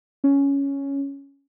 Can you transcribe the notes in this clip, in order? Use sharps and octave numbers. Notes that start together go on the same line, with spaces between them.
C#4